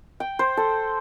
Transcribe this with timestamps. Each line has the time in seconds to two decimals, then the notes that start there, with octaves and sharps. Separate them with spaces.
0.20 G5
0.39 C5
0.57 A4